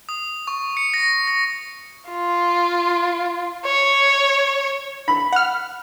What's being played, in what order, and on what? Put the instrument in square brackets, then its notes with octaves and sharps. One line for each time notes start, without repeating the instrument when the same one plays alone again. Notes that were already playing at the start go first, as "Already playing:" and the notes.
[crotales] D#6
C#6
C#7
A#6
A#6
[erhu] F4
C#5
[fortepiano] B5
[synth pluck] F#5 F6